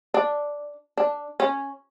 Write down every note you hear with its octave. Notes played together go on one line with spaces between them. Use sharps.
D4
D4
C#4